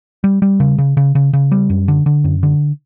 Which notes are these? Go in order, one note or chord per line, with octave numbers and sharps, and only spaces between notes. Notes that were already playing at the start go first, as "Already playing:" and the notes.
G3
G3
C#3
C#3
C#3
C#3
C#3
G3
F#2
D3
D3
F#2
D3